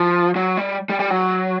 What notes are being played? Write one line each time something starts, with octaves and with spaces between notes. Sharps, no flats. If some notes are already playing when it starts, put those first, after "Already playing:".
Already playing: F3
F#3
G3
G3
G3
F#3